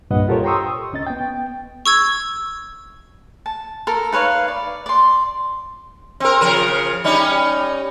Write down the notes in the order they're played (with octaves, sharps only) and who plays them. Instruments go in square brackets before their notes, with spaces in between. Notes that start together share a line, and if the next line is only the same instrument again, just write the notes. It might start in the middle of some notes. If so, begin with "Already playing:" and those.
[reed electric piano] C2 G2 A#2 B4 D#5 F#5
F4 G4 A4 A#4 C5 C#5
G5 A#5 C6 C#6 D#6 E6
C#6 D#6
C#2 C#4 D#5 A6
B3 G5
[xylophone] C#6 E6 G#6
[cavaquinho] A5
A4 A#4
D#4 B4 C#5 F5
D5
D5 C6
[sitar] C4 A#4
C#3 F3 A#4
G3 C#4 D#4